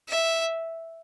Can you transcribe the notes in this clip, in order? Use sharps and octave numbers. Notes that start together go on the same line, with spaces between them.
E5